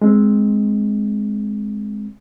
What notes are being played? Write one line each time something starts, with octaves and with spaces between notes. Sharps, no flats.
G#3 C4